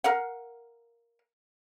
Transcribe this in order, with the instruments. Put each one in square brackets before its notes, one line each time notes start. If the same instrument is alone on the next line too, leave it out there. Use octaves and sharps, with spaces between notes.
[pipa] A#4 F5 F#5